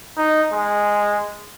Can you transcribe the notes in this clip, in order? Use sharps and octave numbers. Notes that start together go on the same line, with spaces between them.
D#4
G#3